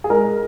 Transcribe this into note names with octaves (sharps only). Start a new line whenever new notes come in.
G#4
G#3 A#4